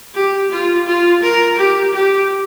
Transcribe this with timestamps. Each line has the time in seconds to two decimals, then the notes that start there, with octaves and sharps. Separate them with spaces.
0.15 G4
0.51 F4
0.87 F4
1.22 A#4
1.57 G4
1.93 G4